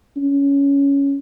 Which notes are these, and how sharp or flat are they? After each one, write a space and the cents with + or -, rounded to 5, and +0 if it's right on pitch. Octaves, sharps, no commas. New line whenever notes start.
C#4 +10